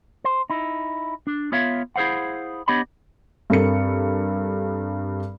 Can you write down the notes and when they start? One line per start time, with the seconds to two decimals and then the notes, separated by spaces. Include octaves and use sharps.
0.24 C5
0.50 D#4 E4
1.27 D4
1.52 B3 F4 C#5 E5 F5
1.96 E4 G#4 A#4 C5 F5 F#5
2.68 B3 D4 G4 C#5 D#5 B5
3.50 G2 C4 A4 A#4 C#7